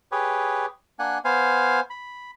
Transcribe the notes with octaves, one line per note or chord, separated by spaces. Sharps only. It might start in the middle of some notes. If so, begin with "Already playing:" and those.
G4 G#4 B4 C#5
A#3 D4 F#5 G#5
B3 C5 F5 G#5
B5